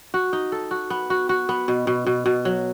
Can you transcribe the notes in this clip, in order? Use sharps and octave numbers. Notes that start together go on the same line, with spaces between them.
F#4
D#4
A4
F#4
B3
F#4
F#4
B3
B2
B2
B2
B2
F#3